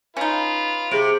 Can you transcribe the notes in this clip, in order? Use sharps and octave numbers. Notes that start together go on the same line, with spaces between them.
C#4 D#4 F4 B4 B5
C3 G#4 D7